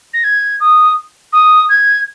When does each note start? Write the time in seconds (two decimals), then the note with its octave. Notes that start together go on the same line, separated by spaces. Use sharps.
0.13 A#6
0.24 G#6
0.60 D#6
1.32 D#6
1.69 G#6